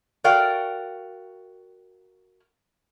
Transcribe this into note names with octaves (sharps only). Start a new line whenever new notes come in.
F#4 A#4 D5 F5 G5